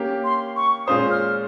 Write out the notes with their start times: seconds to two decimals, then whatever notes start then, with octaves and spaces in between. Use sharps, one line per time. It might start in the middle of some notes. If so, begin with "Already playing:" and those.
Already playing: A#3 C#4 G4
0.24 C6
0.56 C#6
0.87 A#2 G#3 C#4 F4 C5 D#6
1.11 F6